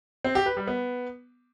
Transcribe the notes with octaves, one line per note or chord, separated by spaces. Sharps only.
C4
G4
B4
G3
B3